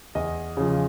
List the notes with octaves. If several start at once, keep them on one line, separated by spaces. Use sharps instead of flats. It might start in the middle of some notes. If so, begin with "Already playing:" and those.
E2 D#5
C#3 F3